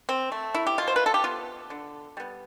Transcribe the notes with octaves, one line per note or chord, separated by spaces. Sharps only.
C4
A3
E4
G4
B2 F4
C5
B4
A4
G4
B3 F4
D3
G3 B3